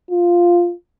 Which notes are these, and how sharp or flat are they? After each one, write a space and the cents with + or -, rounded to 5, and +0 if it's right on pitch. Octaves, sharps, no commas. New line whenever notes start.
F4 +0